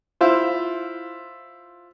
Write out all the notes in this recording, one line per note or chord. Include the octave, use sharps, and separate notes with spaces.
E4 F4 C5